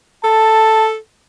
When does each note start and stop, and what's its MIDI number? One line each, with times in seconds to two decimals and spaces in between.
0.24 0.96 69
0.24 0.88 81